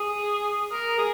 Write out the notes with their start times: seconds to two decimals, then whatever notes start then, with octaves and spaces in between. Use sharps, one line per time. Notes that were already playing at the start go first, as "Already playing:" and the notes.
Already playing: G#4
0.71 A#4
0.98 G#4